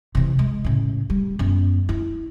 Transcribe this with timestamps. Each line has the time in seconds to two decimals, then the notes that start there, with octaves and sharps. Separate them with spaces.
0.15 C3 E3
0.39 G#3
0.64 A2 C#3
1.10 G3
1.39 F#2 B3
1.89 E4